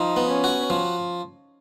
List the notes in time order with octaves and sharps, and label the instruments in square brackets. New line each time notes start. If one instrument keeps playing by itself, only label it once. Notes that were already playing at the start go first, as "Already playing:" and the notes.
Already playing: [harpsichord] F3 [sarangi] D#4
[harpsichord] B3
[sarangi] C#4
[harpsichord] F#4
F3